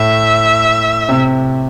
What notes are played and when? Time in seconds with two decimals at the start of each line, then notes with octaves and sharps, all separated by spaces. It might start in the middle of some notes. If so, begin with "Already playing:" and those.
Already playing: A2 E5
1.09 C3